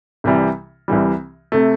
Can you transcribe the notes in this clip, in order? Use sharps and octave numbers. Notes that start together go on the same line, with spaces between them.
C2 C3 E3 G3
C2 C3 E3 G3
C3 A3